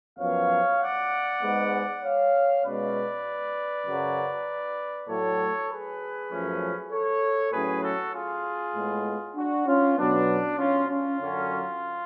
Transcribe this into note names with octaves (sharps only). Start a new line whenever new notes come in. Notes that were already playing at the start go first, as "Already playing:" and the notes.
F#2 F3 B3 C#5 F5
D5 F#5
G#2 G#3 B3
C#5 F5
B2 G#3 C#4 B4 D5
F#2 C#3 F#3
A2 F#3 A3 A4 C#5
G#4 B4
F#2 F3 A3 C#4
A4 C#5
A2 F#3 C#4 G#4 B4
F#4 A4
F4 G#4
A2 G#3 B3
D4 F#4
C#4 F4
B2 F#3 B3 D4
C#4 F4
C#4 F4
F#2 D3 F#3 C#4